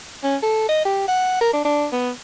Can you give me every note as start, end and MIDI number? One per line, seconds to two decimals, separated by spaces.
0.24 0.36 61
0.43 0.66 69
0.69 0.80 75
0.85 1.07 67
1.08 1.39 78
1.41 1.49 70
1.53 1.60 62
1.65 1.87 62
1.92 2.10 59